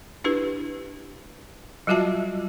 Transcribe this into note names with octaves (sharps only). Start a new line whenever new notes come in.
D4 E4 G4 B4
F#3 G3 F4 F#4 E5 A5